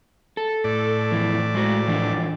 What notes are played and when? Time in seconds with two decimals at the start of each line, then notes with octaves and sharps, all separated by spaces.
0.37 A4
0.64 A2 D5
1.12 F2 E3
1.54 G#3 F#4
1.88 E3 F3 D4